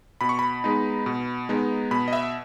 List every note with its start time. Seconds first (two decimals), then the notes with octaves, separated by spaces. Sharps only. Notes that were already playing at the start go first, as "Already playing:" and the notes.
0.21 B2 B5
0.29 C#6
0.39 B5
0.64 G#3 B3 D#4
1.06 B2
1.49 G#3 B3 D#4
1.91 B2 B5
2.08 D#5
2.13 E5